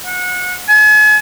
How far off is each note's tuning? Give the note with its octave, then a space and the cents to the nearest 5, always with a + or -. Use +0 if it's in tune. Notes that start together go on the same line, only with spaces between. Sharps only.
F#5 -25
G#5 +45